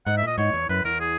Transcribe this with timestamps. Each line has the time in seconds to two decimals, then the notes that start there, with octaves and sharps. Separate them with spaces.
0.06 G#2 F#5
0.17 E5
0.22 A#2 D#5
0.38 G#2 C#5
0.53 E2
0.69 F#2 B4
0.84 E2 A#4
1.00 G#4